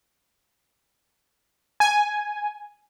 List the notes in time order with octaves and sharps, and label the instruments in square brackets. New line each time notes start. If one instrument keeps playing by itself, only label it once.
[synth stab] G#5